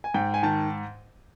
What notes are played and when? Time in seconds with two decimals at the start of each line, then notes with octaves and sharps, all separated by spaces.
0.04 G#5
0.14 G#2 G5
0.34 G#5
0.43 D#3 A5